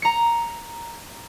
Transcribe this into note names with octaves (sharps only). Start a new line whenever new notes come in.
A#5 C#7